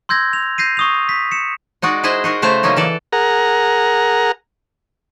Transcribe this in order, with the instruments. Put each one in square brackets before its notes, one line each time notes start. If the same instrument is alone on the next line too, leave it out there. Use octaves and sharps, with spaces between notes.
[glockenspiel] C6 E6 G6 G#6 A#6
F7
G6 A#6 C7 D#7
C#6 D#6 F7
B6
C#7 E7
[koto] G#3 D#4 F#4 D5
E4 G#4 C5 D#5 E5
D#4 F#4 A#4
C#3 A3 E4 C5 A5 A#5
C#3 F#3 A#3 C#4 D#4
E3 A4 D5
[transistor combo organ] G#4 A#4 F#5 A#5